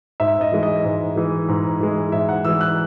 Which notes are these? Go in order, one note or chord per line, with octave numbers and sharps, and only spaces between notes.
G#2 E5
D#5
E3 G#3
D#5
G#2
E3 G#3
G#2
E3 G#3
G#2 E5
F#5
E3 G#3 E6
F#6